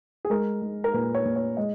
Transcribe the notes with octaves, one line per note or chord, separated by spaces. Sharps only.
G#4
G#3 A#4
G#3
A#4
A#2 B4
C#5
A#2
C#5
G#3 D#5